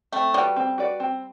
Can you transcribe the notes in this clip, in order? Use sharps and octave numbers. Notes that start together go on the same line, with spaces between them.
A3 C4
G3 F#4 B4 D5
C4
F#4 B4 D5
C4